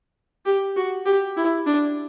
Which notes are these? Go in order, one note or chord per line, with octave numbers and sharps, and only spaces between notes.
G4
F#4
G4
E4
D4